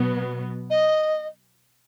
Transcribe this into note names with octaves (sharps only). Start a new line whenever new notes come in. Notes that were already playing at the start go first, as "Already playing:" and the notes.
Already playing: B2 F#3 B3
D#5